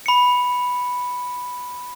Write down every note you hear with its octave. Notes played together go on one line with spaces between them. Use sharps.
B5 C#7